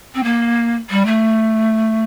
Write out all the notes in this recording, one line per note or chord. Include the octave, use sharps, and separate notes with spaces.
C4
A#3
G3
A3